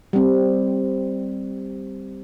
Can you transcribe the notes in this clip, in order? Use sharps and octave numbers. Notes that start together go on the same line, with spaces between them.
G3 C4